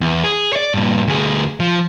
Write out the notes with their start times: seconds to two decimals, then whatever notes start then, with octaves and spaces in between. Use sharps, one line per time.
0.01 E2
0.24 G#4
0.53 C#5 D5
0.74 G2 A#2
1.07 D2 G#4
1.60 F3